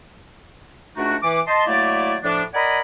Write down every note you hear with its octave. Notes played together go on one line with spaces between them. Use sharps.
C#2 A3 D4 D#4 F#4
E3 D6
D#5 A5 C6
F#3 A3 A#3 E4 D5
A2 F3 D4
A#4 D5 D#5 F#5 G#5 B5